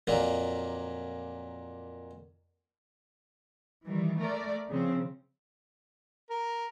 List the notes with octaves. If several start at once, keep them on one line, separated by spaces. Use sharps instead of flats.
F2 A#2 F#3 A#3
D#3 E3 G3
A3 A#4 D5
C#3 F3 C4
A#4